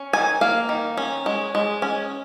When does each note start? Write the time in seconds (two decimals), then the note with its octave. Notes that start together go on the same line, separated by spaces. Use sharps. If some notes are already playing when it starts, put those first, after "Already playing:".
Already playing: C#4
0.13 D#3 G#5
0.41 A#3 F5
0.69 D#3
0.97 C#4
1.26 G#3
1.55 G#3
1.82 C#4